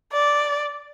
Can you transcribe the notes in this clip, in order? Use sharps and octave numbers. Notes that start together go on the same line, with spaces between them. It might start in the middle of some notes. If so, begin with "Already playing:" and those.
D5